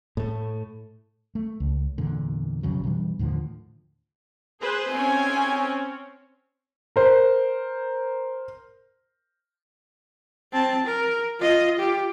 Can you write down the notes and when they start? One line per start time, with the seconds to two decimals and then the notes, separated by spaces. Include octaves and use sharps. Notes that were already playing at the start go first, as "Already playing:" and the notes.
0.17 A2 A3
1.35 A3
1.60 C#2
1.98 E2 A#2 D3
2.63 B1 F2 C#3 F#3
2.84 B2 E3 G3 D4
3.19 D#2 A2 D3 F3
4.62 G#4 B4 C5
4.92 C4 C#4 G#5
6.96 A#4 C5
10.53 C4 A5
10.87 A#4
11.40 F4 D#5
11.79 F4 G4